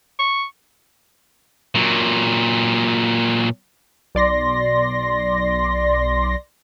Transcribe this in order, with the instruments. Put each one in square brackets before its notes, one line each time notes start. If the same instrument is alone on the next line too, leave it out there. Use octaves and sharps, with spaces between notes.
[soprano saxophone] C#6
[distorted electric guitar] A#2 F#3
[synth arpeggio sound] B1 D5 C6 A#6